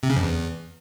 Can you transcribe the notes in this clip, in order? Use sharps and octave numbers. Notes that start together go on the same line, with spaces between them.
C3
C#3
F2
E2